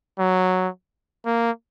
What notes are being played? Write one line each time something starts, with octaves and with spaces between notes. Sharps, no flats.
F#3
A#3